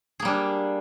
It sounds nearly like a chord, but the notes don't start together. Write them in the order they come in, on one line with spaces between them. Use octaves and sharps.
G#4 A#3 G3 D4